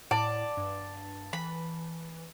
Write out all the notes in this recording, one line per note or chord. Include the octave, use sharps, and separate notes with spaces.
A2 D5 A5
G2
E3 B5